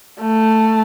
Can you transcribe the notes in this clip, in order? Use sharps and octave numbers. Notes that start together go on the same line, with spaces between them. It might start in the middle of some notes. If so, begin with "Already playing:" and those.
A3